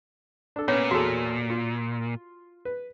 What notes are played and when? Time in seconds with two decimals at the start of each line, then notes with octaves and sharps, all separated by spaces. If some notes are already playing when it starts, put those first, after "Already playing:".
0.56 D4 A4
0.68 A#2 B3 C#4 C#5
0.91 E2 F#4 G#4 A4
1.50 F4
2.65 B4